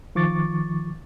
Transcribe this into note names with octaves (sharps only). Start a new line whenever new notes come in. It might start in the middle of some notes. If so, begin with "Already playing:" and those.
D#3 F3 C#6 D6 A6